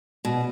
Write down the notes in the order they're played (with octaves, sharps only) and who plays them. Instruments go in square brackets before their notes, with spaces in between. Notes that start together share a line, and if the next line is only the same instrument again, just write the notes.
[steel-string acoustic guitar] B2